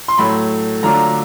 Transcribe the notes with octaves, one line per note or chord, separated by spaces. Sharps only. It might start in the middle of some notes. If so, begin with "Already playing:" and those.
C6
A2 F#3 A3 B5
D3 F#3 A3 D4 F4 A#5